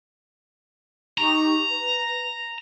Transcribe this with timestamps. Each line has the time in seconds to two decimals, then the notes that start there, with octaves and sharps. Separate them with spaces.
1.18 D#4 G4 A#5 C#6
1.69 B4